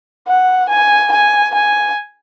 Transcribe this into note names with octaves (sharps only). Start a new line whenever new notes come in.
F#5
G#5
G#5
G#5